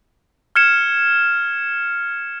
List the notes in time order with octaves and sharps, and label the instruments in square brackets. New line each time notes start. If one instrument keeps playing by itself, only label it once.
[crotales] F6 G#6 C#7 E7